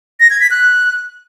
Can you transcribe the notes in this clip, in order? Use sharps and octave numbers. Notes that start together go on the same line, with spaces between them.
A#6
G#6
B6
F#6